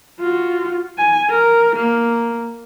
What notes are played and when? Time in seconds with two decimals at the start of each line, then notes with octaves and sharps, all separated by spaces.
0.20 F4 F#4
0.98 G#5
1.30 A#4
1.76 A#3